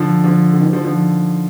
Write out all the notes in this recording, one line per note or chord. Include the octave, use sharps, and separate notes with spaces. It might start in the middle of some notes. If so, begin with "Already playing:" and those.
Already playing: D3 F3
D3 F3
D3
D#3
D3 F3
D3 F3